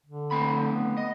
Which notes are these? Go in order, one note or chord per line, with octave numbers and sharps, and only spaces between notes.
D3
A3 C4 B5
B3
D#5